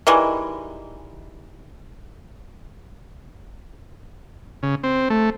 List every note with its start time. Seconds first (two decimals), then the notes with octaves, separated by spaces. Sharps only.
0.07 D#3 E3 G3 G#3
4.63 C#3
4.84 C4
5.10 A3